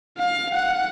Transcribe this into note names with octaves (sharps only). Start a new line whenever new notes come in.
F5
F#5